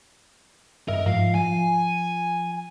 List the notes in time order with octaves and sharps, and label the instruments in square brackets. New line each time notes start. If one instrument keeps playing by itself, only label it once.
[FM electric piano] G2 D#5 E5 [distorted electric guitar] A#4
[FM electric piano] G#2 F3 [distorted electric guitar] F5
[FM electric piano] F3 [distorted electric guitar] G#5